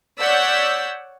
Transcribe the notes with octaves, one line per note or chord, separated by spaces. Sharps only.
C#5 D5 F#5 E6 G6 B6